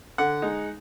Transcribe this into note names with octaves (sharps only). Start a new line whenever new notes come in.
D3 F#5
G#3 D#4